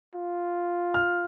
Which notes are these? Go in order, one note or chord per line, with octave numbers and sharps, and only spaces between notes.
F4
F6